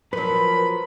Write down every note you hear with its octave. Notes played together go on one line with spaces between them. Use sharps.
F3 F#3 A#4 B4 B5